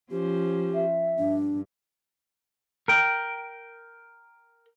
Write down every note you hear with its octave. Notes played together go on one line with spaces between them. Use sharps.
F3 C#4 G4 C5
E5
G2 D4
A#4 G5